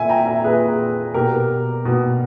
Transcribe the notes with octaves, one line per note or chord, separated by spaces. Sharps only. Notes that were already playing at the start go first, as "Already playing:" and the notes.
Already playing: A#2 E5 G#5
G5 A#5
E5 G#5
A#2 G#4 B4
B2 G4 A#4
B2